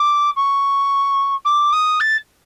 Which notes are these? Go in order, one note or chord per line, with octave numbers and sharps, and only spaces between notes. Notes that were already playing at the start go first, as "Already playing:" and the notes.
Already playing: D6
C#6
D6
D#6
A6